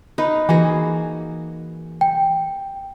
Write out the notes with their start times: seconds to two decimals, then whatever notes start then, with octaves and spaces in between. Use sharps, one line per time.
0.18 D#4 B4 F5
0.49 E3 A#3 F#4 G#4
2.01 G5